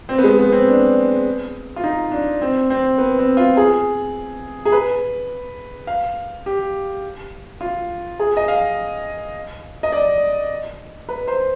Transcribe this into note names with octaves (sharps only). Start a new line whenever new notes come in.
C4
B3
G#3
B3
C4
D4
F4
D#4
D4
C4
C4
B3
C4
F4
G#4
G#4
B4
F5
G4
F4
G#4
D#5
F5
D#5
D5
B4
C5